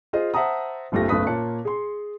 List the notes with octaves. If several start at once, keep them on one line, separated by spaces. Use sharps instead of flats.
F4 G#4 C5 D#5
C5 E5 F#5 A5 A#5 D#6
F#1 B1 A3 F4 G4 A#6
F#1 B1 A3 B4 D#6 B6
A#2 A#3 C#5 A5 F#6 C#7
G#4 C6